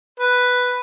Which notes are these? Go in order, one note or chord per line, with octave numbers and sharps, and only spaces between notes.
B4